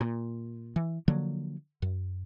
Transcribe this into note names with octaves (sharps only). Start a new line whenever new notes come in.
A#2
E3
D3 F3 F#3 A#3
F#2